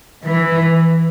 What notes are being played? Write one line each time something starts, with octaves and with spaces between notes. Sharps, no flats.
E3